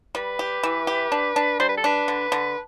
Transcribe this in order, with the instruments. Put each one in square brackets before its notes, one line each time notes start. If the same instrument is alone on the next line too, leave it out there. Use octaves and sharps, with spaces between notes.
[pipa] G3 [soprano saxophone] B4
[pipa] G4
E3
G4
D4
D4
[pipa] G3 [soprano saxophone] C5
[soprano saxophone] B4
A4
[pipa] D4 [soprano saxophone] B4
[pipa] D3
D3